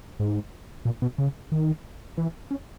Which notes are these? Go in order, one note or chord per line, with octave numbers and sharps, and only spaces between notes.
G#2
A#2
B2
C#3
D#3
E3
C#4